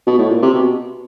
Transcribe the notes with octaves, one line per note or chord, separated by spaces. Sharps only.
B2
A2
A#2
C3
B2